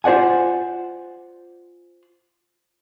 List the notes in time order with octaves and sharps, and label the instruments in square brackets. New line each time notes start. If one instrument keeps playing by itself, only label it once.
[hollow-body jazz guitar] F4 C5 D5 F#5 G#5